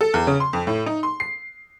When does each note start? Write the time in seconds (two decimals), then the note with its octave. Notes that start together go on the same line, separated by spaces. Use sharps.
0.01 A4
0.14 E2
0.27 C#3
0.40 C6
0.53 F2
0.67 A2
0.86 D#4
1.03 C6
1.20 C7